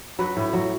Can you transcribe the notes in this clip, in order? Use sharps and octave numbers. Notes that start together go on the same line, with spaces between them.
F#3 B4
A2
F#3